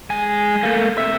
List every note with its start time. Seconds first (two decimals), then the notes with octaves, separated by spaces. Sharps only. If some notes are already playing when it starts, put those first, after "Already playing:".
0.10 G#3 G#5
0.63 A3 A#3
0.98 C3 E5